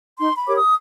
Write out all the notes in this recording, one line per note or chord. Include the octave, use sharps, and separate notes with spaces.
D#4 C6
B5
G4 A#4 C#5 D6
D#6